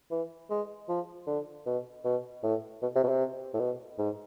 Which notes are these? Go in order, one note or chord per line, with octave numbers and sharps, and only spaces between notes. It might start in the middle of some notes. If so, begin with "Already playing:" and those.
E3
G#3
F3
D3
B2
B2
A2
B2
C3
B2
C3
A2
B2
G#2